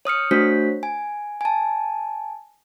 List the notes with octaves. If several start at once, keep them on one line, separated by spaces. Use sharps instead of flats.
C#5 D#6 F6 C#7
A3 D4 F#4 C5 C#5 B6
G#5
G#5 A5